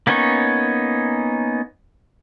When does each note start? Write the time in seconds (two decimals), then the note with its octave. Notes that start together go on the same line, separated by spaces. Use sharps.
0.07 A#3 B3 C#4 D#4 C#5